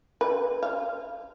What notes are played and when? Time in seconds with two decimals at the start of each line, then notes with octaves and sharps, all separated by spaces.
0.21 B4
0.63 F5